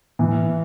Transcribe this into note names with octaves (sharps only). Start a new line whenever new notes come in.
E3